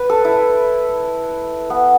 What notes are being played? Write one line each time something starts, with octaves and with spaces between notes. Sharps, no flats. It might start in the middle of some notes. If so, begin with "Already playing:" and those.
Already playing: B4
A4
E4
B3